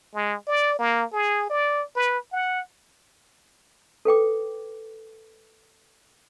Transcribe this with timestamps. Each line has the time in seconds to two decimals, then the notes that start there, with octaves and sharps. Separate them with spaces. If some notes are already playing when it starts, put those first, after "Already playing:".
0.14 G#3
0.47 D5
0.79 A#3
1.13 G#4
1.50 D5
1.96 B4
2.33 F#5
4.05 A4 B4 G5 D6